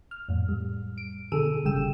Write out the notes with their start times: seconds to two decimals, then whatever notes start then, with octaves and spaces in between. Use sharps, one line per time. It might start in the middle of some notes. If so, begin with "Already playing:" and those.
0.11 F6
0.29 F2 A2
0.49 G3
0.98 D7
1.32 B2 D3 G#4 A4 E6 D#7
1.65 G1 C#3 G3 G5 E6 E7